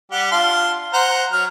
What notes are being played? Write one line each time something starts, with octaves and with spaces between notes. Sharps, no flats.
G3 G4 F#5
D4 F4 C6
C5 F#5 A#5
F#3 F6